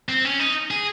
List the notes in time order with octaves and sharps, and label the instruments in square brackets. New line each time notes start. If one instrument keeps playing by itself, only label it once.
[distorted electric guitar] C4
C#4
D#4
G#4